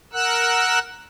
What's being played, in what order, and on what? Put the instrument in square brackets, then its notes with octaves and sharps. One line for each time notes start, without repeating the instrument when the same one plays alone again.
[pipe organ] A#4 F#5 E6 F#6